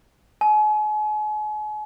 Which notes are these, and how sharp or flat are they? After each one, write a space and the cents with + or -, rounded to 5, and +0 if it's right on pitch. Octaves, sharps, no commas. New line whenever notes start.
G#5 +40